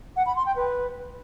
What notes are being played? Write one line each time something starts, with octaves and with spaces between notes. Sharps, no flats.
F#5
B5
C6
G5
B4